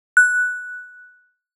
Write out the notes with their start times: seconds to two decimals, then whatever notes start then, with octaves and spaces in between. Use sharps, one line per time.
0.17 F#6